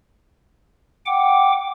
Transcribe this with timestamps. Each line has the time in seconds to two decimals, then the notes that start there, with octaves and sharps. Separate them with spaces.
1.06 F#5 G5 D6